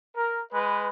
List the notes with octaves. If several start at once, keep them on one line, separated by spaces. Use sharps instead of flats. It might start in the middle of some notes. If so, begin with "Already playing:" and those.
A#4
G#3 B4